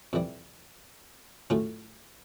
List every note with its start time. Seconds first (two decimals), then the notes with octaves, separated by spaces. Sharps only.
0.13 F2 C3 E3 G3
1.50 A2 F#3 A3 C#4 F4